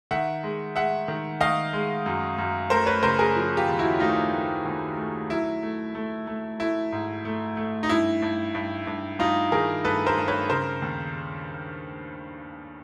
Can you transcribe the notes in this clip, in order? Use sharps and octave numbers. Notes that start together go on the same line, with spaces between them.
D#3 E5 F#5
G#3
G#3 E5 F#5
D#3
D#3 D#5 F5
G#3
F#2
F#2
A3 A#4 C5
B4 C#5
C#3 A#4 C5
G#4 A#4
F3
F4 G4
D#2
E4 F#4
A3 D#4 F4
A3
D#2
A3
F#3 E4
A3
A3
A3
A3 E4
G#2
A3
A3
D#4
G2 E4
G2
G2
G2
G2 D#4 F4
D#3 G#4 A#4
G2 A4 B4
A#4 C5
G2
B4 C#5
C#3 A#4 C5
D#2